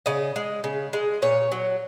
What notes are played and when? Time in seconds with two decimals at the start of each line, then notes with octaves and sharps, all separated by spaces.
0.06 C#3 D#5
0.36 G#3
0.64 C#3
0.93 G#3
1.22 A#2 C#5
1.52 F#3